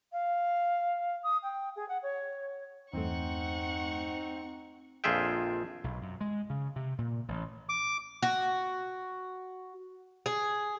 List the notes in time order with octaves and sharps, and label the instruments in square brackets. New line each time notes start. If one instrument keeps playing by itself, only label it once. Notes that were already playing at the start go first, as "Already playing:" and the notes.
[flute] F5
D#6
G5
G#4
F#5
C#5
[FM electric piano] E2 G2 A3 [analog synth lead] C4 [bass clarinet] D#4 [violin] F#5 C#6
[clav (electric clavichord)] A#1 F2 F4 G#4 E5 G5
[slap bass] B1
F#2
G#3
C#3
C3
A#2
A1
[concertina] D6
[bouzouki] F#4
G#4